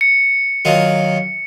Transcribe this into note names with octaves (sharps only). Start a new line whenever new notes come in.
C#7
D#3 F#3 F4